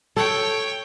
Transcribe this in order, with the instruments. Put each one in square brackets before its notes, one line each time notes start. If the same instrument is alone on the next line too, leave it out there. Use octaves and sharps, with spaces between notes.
[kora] A4 [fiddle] C#5 G5